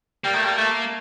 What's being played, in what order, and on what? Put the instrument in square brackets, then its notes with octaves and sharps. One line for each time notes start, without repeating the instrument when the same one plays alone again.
[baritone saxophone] G3 [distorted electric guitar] A#3
[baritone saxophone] A3
G3
A3